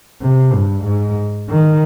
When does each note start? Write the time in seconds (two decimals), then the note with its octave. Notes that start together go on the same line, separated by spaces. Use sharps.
0.22 C3
0.53 G2
0.85 G#2
1.49 D#3